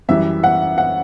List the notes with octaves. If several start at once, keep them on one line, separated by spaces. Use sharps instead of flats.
F#2 E3 G3 E5
F#5
F#5